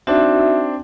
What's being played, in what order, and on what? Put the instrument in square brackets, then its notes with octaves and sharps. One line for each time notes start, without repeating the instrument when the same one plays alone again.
[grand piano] C4 D4 [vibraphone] D#4 F#4 E5